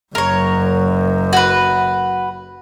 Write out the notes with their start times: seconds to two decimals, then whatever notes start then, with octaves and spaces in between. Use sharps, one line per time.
0.15 F#1 F#2 A#4 C#5
1.33 F#4 B4